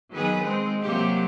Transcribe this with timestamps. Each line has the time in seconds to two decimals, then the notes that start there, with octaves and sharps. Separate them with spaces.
0.12 D#3 F#3 B3 G#4 B4
0.42 G#3 C4
0.83 C3 F#3 A#3 G4